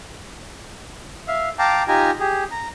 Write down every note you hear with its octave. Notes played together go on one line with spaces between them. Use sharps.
E5 F5
F5 G5 A5 A#5 D6
D#4 F4 G4 G#5 A#5
G4 G#4
A#5